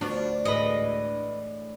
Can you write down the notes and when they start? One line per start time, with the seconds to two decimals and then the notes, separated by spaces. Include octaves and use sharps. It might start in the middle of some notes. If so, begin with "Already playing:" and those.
0.01 D2 F3 B3 D4 F#4
0.45 A2 E3 G#3 B4 D#5